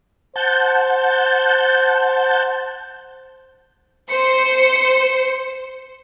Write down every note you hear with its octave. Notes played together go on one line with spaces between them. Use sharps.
C5 F#5 A5 G6
C5 C#7